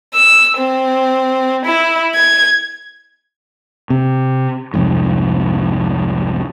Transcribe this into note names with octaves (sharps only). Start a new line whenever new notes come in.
E6
C4
E4
G#6
C3
C2 F2 G#2